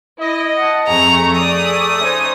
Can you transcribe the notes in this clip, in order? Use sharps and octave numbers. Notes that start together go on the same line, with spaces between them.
E4 D#5
F#5 A5
F2 A3 G#4 A#5 C#6
G#4 D5 D#6
C#4 D#4 C5 G#5